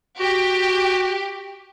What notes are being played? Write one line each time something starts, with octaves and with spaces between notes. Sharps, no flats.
F#4 G4